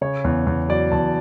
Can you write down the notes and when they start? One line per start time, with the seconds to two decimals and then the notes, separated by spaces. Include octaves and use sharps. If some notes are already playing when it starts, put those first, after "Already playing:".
0.01 C#3 C#5
0.24 E2
0.47 E2
0.69 F#3 D5
0.92 E2 A5